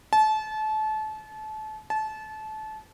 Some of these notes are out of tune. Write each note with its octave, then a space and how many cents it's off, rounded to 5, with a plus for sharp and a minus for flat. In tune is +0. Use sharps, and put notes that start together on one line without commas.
A5 -30
A5 -25